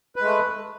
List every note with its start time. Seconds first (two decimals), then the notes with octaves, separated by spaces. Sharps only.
0.16 B4
0.21 G#3
0.25 A3